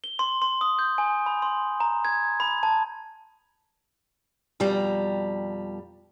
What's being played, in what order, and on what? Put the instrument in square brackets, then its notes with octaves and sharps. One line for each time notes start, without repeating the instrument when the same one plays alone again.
[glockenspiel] G7
C6
C6
D#6
G6
G#5
B5
C6
A#5
G#6
B5
A5
[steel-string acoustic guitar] F2 B2 G3 A#5